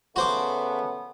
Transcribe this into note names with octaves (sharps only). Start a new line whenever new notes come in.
C#3 A3 B3 F#4 C5 D6